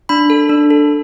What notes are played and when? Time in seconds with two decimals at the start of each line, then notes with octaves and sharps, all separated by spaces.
0.09 D4 B5
0.30 A4
0.50 D4
0.70 A4